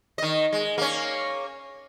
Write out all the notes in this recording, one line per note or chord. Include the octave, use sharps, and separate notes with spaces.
D#3 D#5
G#3
A#3 C#4